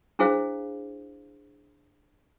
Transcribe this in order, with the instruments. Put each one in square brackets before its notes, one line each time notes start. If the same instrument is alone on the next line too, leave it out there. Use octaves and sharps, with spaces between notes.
[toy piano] D4 E4 G#4 C5 F5